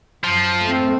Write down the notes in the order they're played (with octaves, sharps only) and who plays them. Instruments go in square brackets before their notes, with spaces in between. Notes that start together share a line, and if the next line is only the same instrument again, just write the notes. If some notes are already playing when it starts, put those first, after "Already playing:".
[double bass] F#2 [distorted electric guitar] F3
[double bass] A3 C4